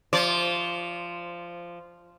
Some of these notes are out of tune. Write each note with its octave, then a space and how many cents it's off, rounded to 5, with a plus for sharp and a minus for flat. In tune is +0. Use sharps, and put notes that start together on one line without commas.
F3 -10 D5 -30